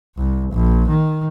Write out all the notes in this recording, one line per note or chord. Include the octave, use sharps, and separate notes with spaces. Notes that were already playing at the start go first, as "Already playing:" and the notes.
C2
A#1
D#3